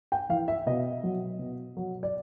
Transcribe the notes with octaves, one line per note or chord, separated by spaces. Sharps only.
G5
E3 F5
E5
B2 D#5
F#3
B2
F#3
D5